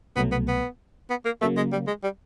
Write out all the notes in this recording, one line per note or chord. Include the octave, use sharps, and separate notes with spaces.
C2 B2 F#3 A3 B3
B3
B3
B3
A#3
C#3 F#3 A3 A#3
G#3
G3
G#3
G3